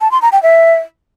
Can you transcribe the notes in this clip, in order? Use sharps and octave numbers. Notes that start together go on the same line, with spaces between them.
A5
C6
A#5
G5
E5